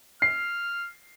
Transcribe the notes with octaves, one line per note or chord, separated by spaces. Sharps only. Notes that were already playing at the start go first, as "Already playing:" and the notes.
F6 C7